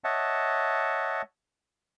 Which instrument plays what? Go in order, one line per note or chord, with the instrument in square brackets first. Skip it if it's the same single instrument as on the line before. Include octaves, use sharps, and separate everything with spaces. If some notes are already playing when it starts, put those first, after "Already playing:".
[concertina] C#5 D#5 E5 F#5 A5